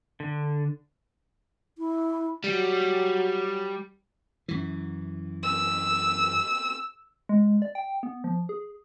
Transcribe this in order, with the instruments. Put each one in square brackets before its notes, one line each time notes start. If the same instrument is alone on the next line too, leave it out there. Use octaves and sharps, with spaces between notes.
[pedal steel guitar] D3
[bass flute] E4
[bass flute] F#3 [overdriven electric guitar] G3
[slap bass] F#2 E3
[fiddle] E6
[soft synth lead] G#3
D5
G5
B3
F3
G#4